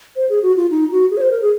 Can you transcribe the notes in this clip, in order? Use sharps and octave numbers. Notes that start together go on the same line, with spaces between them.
C5
G#4
F#4
F4
D#4
F#4
G#4
C#5
C5
A#4
G#4